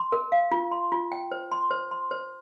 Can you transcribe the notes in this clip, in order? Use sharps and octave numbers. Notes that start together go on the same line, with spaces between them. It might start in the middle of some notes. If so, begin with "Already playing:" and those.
Already playing: C6
A#4
F5
F4
C6
F4
G5
C5
C6
C5
C6
C5